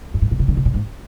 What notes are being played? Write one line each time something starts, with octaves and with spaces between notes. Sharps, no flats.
G2
G#2
A#2
C3
D3
C3
A#2
G#2